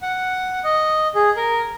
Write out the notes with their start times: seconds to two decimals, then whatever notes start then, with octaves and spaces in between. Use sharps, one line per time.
0.02 F#5
0.64 D#5
1.15 G#4
1.37 A#4